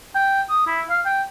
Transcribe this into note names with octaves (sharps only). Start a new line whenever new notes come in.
G5
D#6
E4
F5
G5